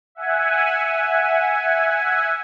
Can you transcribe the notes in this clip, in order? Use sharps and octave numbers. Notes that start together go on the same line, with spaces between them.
E5 F#5 G#5